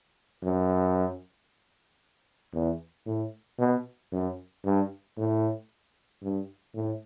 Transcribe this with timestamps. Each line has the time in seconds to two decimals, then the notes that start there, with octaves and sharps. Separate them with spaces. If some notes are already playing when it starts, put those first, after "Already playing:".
0.44 F#2
2.54 E2
3.07 A2
3.59 B2
4.12 F#2
4.65 G2
5.18 A2
6.23 G2
6.75 A2